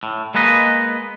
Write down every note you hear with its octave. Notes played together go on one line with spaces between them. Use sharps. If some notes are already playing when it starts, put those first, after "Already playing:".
A2
G#3 A#3 B3 B4 D#5